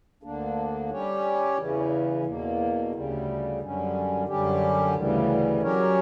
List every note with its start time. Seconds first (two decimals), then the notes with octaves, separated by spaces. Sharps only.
0.23 D2 D3 A#3 D4
0.91 G3 C#4 G4 C#5
1.57 E2 C#3 E3
2.25 E2 B2 A#3
2.92 D2 C#3 G3
3.60 F#2 D3 G3 C#4
4.27 F#2 D3 G3 C#4 G4
4.95 D2 C#3 E3 G3
5.62 F#3 C#4 G4 A#4 C#5